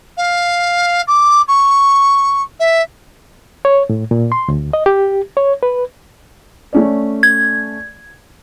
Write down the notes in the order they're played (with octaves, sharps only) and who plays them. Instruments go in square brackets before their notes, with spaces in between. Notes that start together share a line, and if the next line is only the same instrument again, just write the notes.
[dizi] F5
D6
C#6
E5
[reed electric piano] C#5
A2
A#2
C6
D2
D#5
G4
C#5
B4
[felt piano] A3 C#4 D5
[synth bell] G#6